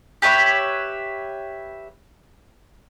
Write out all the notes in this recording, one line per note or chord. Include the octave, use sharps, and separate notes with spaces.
G4 B4 C#5 E5